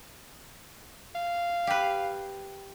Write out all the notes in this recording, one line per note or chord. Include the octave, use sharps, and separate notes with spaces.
F5
G4 B4